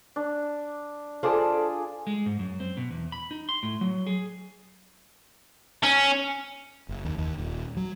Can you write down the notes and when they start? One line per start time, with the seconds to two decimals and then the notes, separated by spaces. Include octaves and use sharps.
0.16 D4
1.23 D4 F4 G#4 A4 C5 D5
2.07 G#3
2.26 G#2
2.39 F#2
2.60 C4
2.77 B2
2.90 E2
3.12 B5
3.31 D#4
3.49 C6
3.63 A2
3.81 F#3
4.07 G#4
5.83 C#4
6.89 F#1
7.05 D#2
7.18 D#2
7.38 D#1
7.77 F#3